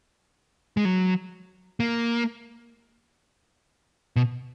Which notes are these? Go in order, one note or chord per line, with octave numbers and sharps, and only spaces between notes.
G#3
F#3
A#3
B2